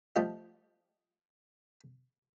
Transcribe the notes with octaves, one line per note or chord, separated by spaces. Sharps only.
F3 A3 F4 G4 D5 D#5